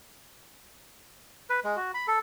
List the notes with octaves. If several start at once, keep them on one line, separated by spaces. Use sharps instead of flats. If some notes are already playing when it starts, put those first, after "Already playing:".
B4
G#3
F#4
B5
A4